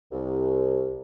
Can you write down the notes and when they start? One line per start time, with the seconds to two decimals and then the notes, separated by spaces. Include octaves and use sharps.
0.12 C2